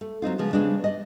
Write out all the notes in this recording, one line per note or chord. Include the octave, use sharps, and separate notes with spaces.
A3
F#3 C4 D#4 F4
C#3 F3 G#3 B3
C#3 G3 G#3 B3 C4 D4
D5 D#5